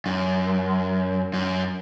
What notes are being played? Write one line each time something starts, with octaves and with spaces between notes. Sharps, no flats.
F#2
F#2